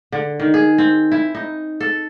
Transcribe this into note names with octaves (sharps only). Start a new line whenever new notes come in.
D3
D#3
G#4
C4
E4
D#4
A4